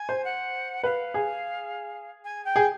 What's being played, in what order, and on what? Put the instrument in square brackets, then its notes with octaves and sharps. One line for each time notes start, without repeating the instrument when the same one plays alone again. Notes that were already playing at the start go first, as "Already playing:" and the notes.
Already playing: [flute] G#5
[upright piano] C5
[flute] F#5
[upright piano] B4 [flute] F5
[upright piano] G#4
[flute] G#5
G5
[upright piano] G#4